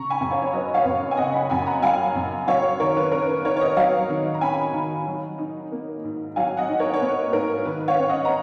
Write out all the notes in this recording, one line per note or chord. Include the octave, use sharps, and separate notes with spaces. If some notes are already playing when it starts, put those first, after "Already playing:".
Already playing: C#3 A#5 C#6
G#5 B5
F#2
C#5 F5
C#5
F#3 B4 D#5
C#5 F5
F#2
G#5
C#3 D#5 F#5
G#5 B5
F#2 G#5 B5
F#5 A#5
F#3 F5 G#5
F#2
F#3 C#5 F5
D#3 A#4 C#5
B4
C#4 A#4
B4
D#3 A#4 C#5
C#5
B4 D#5
F#3 C#5 F5
D#3
A#5
C#4 G#5 B5
D#3
F#3
D#4
A#3
G#2
F#3 F5 G#5
D#5 F#5
D#4
A#4 C#5
C#5
A#3 B4
G#2 A#4
D#3 B4
C#5 F5
C#4
D#5 F#5
A#5